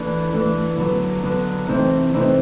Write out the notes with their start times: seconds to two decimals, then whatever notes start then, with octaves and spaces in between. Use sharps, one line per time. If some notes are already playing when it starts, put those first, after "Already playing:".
Already playing: E3 A3 D4
0.33 E3 A3 D4
0.77 D3 F#3 B3
1.23 D3 F#3 B3
1.68 C3 E3 A3 C4 D#4
2.13 C3 E3 A3 C4 D#4